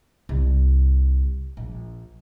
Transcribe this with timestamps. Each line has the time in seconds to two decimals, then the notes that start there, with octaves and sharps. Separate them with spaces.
0.29 C2
1.57 A#1